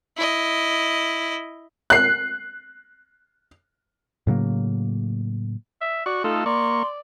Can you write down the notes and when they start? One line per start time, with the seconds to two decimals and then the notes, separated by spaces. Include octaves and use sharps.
0.17 E4 D#5
1.90 F#6 C7
4.27 A2 C#3 F#3 A#3
5.81 E5
6.06 F#4 D5 C#6
6.24 A3 D#4 F4 A4 C6
6.46 A#3 D5 C6 C#6